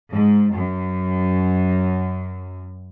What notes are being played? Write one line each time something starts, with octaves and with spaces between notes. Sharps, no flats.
G#2
F#2